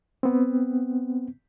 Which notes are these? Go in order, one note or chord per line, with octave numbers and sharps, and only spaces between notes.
B3 C4